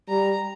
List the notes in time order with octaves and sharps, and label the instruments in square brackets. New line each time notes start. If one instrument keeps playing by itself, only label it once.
[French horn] G3 [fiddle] A#5